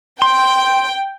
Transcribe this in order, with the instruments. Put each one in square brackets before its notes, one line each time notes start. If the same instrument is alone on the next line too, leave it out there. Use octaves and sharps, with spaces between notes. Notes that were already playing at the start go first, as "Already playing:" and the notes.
[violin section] G5 [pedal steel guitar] C6